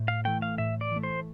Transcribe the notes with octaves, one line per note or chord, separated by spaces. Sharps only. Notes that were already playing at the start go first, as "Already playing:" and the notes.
Already playing: A2
F5
E3 A3 G5
F5
A2 E5
D5
E3 A3
C5